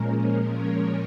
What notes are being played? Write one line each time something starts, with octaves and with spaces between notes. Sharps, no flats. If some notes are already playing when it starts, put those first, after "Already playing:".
Already playing: A#2 F3 G#3 C#4 A#4
C#5